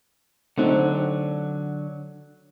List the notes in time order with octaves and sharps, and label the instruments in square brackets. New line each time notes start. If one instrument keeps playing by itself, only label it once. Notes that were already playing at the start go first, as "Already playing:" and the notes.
[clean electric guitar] D3 F#3 [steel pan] A3 C4 D#4